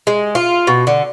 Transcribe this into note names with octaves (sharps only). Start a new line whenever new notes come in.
G#3
F4
B2
D3